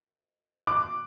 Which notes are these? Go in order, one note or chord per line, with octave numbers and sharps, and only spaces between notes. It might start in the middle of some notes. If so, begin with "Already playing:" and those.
D6 F#6